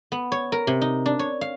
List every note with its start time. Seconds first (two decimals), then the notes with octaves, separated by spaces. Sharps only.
0.12 B3
0.32 C#5
0.52 A#4
0.67 C3
0.81 D#4
1.06 D4
1.19 C#5
1.41 F5